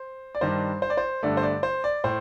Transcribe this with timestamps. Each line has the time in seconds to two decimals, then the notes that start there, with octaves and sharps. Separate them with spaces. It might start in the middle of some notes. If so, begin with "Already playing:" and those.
Already playing: C5
0.35 D5
0.41 G2 D#3 G3 D4 C5
0.82 C5
0.90 D5
0.97 C5
1.23 G2 D3 A3 D5
1.37 C5
1.43 D5
1.63 C5
1.84 D5
2.04 A2 C5